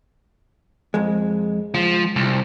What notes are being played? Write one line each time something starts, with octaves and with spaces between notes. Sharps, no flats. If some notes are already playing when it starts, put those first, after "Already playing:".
F2 G#3
C#2 F3
C2